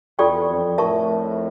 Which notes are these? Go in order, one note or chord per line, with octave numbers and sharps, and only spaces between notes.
E2 F4 A4 D5 G5 C#6
F2
F2 A2 A#4 E5 A5 C#6